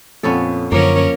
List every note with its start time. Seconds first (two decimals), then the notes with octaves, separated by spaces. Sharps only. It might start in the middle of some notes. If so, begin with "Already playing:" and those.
0.23 F2 A#2 B3 C#4 A4
0.72 F#2 D3 F3 A#3 C#4 A#4 C#5